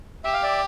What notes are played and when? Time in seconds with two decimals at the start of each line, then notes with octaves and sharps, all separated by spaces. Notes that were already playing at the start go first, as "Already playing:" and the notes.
0.24 G4 E5
0.33 F5
0.43 D5 E5